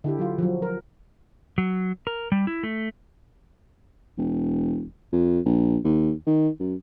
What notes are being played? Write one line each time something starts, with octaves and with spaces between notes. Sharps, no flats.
D3 E4 G4
F#3 F4
F3 F#3
A#4
F#3
A#4
G3
E4
A3
E1
F2
A#1
D#2
D#3
F#2